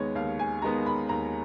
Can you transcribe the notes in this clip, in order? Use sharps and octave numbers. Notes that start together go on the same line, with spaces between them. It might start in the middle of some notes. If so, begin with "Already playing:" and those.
Already playing: D#2 D#3 G#3 B3 C#5
D#2 F5
G#5
D#3 G#3 B3 A#5
B5
D#2 A#5